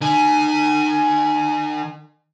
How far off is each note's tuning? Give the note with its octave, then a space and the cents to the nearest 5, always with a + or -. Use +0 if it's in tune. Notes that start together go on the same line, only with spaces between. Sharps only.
D#3 -40 G#5 +10